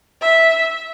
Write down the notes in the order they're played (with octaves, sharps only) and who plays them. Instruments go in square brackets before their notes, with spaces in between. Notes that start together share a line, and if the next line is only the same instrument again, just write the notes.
[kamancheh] E5